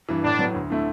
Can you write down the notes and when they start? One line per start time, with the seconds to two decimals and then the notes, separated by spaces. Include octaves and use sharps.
0.09 G2 E3
0.24 A2 D4
0.39 F#3 B3
0.54 D2
0.70 D3 A3 E4